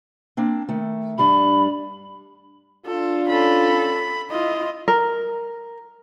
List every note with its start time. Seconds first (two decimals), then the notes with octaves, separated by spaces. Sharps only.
0.37 A#3 C4 D4
0.69 D#3 A3
1.18 G2 G3 D4 B5
2.86 D4 F4 A4
3.28 C#4 A4 B5
4.31 E4 F4 D#5
4.88 A#4